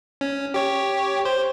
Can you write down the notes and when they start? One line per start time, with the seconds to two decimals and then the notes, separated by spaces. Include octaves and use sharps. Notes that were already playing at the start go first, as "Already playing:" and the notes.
0.21 C#4
0.54 G4 C#5
1.25 C5